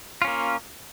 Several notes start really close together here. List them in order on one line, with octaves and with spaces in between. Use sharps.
F4 C#4 A#3